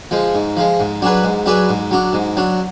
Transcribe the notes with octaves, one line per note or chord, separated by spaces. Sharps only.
F3 G#3
G#2
F3 G#3
G#2
F#3 D4 G#4 B4
G#2
F#3 D4 G#4 B4
G#2
F#3 D4
G#2
F#3 D4